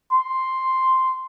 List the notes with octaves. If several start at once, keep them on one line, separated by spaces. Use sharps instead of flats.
C6